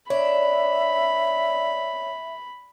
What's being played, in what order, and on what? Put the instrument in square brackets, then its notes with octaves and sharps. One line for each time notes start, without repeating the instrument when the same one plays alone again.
[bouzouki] D4 [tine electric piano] C#5 [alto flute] E5 [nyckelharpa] B5